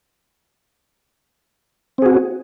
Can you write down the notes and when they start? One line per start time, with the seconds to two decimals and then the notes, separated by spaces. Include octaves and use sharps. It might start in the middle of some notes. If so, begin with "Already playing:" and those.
1.98 C4
2.02 G#4
2.06 F#4